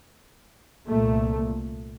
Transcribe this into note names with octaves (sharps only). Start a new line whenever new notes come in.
C2 A#2 A3